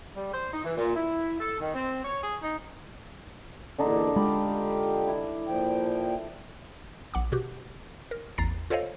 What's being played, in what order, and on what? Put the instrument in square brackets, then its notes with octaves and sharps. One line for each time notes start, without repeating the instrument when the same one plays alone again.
[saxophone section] G3
C5
D#4
E3
A#2
E4
A4
D#3
C4
C#5
G#4
D#4
[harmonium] E2 A#2 [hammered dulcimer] D3 D4 D#4
[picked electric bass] G#3 [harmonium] F4 G4 [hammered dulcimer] B5
[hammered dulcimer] E4
[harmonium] A#2 F3 G5
[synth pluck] A#1 F#5 D6
B2 F#4 G4
A#4
A1 E2 A#5 A6 C7
F4 A4 C5 C#5 D#5 F5